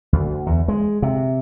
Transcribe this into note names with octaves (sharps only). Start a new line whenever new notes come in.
D2
E2
G#3
C3